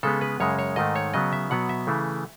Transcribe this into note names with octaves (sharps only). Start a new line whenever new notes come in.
C#3 G#3 B3 A4
B4
F#2 C#3 G#3 C#5
C#5
G#2 D#3 A3 D#5
C#5
C#3 F#3 B3 D#5
E5
B2 F#3 B3 F#5
E5
C#3 E3 A3